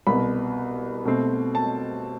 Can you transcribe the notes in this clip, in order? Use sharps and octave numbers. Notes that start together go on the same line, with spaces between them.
C2 B2 B3 B5
B2 A3 C4
A5